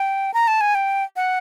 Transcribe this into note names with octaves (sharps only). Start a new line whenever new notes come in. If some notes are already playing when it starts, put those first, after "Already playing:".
Already playing: G5
A#5
A5
G#5
G5
F#5